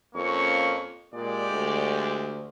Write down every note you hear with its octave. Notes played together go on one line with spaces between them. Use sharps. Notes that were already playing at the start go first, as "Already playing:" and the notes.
F2 A#3 C#4 C#6
A#2 G#3 G4 D5
D2